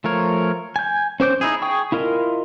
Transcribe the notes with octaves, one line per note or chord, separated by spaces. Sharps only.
F3 A3 F4 A#4 C#5
G#5 G6
C#4 C5 D6 G6
D#4 E4 G#4
G#4 G5 C#6
E4 F4 A#4 D#5